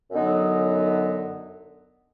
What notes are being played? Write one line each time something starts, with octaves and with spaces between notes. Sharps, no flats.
F#2 D3 F#3 B3 D#4